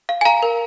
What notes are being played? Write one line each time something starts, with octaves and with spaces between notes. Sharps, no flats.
F5
G#5
F5 A#5
A#4